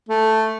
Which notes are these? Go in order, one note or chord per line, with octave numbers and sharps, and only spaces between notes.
A3